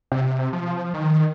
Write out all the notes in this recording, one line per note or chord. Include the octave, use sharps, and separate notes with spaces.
C3
F3
D#3